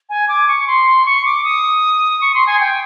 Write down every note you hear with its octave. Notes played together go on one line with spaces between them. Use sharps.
G#5
D6
C#6
C6
C#6
D6
D#6
C#6
C6
G#5
G5